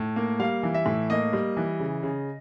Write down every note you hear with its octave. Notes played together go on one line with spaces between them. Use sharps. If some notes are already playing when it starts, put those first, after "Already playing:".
Already playing: A2
A#3
G3 F5
E3
E5
A2
A#3 D#5
G3
E3
C#3
C#3